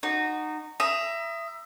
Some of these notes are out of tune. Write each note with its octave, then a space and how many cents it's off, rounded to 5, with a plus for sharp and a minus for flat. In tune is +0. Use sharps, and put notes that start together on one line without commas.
D#4 -20 F#4 +0
E5 +25 A#5 +30 D#6 +0